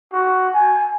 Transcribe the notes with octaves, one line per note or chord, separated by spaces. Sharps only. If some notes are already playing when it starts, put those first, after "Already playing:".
F#4
G#5